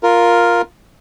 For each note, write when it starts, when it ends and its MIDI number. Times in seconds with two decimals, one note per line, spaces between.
0.03 0.62 65
0.03 0.62 70